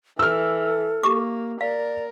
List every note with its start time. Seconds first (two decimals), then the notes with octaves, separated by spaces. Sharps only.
0.19 E3 A4 E6 F6
1.03 A#3 G4 C#6 D6
1.61 A#4 D5 F5